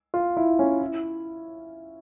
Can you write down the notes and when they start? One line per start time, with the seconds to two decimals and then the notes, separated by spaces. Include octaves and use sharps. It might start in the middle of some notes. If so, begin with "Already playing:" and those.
0.14 F4
0.37 E4
0.59 C#4
0.81 E4